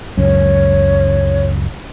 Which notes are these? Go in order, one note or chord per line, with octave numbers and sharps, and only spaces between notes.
C#2 F#2 C#5